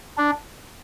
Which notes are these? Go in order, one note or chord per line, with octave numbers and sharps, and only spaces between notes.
D4